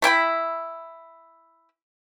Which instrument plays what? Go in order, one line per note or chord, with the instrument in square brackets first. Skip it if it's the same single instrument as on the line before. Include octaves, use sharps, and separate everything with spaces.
[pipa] A3 E4 G5 B5